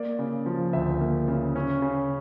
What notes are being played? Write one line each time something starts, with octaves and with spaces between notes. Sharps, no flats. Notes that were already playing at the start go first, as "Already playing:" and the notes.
Already playing: A#3 D5
C#3
F3
D2 E5
A#3
C#3
C#4
C#3